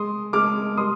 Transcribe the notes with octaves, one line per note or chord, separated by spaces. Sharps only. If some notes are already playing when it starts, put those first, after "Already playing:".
Already playing: G#3 C6 D#6
G#3 D6 F6
G3 C6 D#6